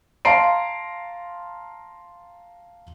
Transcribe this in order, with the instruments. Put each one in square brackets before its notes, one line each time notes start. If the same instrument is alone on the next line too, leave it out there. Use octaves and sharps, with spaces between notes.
[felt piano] F5 A5 A#5 C6 C7 D7